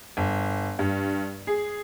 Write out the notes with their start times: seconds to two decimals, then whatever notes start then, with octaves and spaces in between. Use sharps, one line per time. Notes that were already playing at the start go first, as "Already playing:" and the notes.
0.17 G1
0.79 G2
1.47 G#4